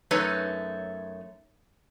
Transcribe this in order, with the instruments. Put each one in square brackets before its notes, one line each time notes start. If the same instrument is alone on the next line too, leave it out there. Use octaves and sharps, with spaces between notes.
[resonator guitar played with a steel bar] F#2 A3 D#4 B4 C#5